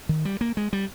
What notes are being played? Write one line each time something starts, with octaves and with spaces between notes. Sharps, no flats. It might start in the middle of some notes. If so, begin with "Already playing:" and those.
D#3
G3
A#3
G#3
G3